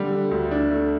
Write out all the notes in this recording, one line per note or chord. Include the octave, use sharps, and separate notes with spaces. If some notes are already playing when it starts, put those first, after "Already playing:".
Already playing: D3 G3
D3
D2
D4
A3